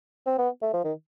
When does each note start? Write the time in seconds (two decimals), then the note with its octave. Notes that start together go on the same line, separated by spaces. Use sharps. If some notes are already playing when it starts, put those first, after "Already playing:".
0.26 C4
0.38 B3
0.62 A3
0.74 F3
0.84 D#3